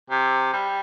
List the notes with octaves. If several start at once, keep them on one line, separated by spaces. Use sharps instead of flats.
C3
G3